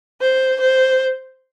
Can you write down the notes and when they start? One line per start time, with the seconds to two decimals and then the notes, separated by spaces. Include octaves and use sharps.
0.21 C5
0.60 C5